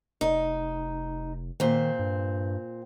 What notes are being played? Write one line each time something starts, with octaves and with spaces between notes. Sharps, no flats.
F1 D#4
A#2 D#3 C4
G2